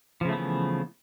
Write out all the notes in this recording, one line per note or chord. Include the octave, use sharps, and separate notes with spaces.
C#3 E3 F3 A3 B3